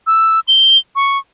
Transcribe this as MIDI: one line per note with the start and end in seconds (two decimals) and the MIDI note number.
0.07 0.40 88
0.48 0.78 103
0.96 1.18 85